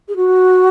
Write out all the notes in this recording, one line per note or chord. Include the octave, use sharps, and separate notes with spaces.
G#4
F#4